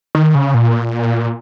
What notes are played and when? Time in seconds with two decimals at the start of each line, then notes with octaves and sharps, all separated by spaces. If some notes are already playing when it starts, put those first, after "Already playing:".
0.15 D#3
0.35 C#3
0.54 A#2